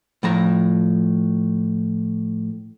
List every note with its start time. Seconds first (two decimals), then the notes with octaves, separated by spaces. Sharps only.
0.23 A2 F3 A#5